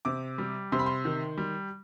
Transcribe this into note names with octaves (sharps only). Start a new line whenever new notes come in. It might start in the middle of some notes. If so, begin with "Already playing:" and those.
C3 D6
G3
C3 C6
B5
C6
D#3
G3